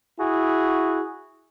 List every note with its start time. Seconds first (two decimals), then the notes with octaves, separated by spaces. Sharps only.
0.20 E4 F#4 G#4